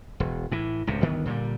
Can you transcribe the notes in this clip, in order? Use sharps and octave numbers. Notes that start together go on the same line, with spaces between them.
E1
A2 E3
C#2 A2 C3
G1 D2 D#3 B3
A#2 D3 F3 G3